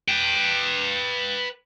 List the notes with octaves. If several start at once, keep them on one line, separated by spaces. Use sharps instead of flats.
B4 G5